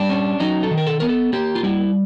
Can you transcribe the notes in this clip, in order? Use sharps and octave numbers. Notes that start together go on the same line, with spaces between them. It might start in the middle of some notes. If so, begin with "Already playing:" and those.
Already playing: G3 D4
C#4
F#3 D#4
A4
D#3
A#4
A4
B3 A#4
A4
A#3 G4
F4
G3 E4